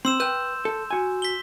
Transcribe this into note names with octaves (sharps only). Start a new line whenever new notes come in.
C4 C6 E6 E7
B4 G5 E6 G6
A4
F#4 G#5
B6 G7